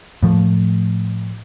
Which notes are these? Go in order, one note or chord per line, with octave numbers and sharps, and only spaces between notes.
A2 F3 A3